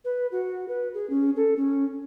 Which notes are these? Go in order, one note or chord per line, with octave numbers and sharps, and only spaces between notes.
B4
F#4
B4
G#4
C#4
A4
C#4